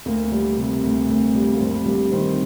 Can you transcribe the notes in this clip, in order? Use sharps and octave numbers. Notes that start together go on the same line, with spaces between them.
D2 A#3
G3
C3
D2
D2
G3
A#3
G2 C4
G3 A#3
D#3 C4